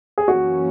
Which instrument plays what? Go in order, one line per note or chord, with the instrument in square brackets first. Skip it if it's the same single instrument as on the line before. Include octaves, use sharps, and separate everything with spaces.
[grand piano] G#4
[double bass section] F#2 E3 A#3 C#4 [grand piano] F#4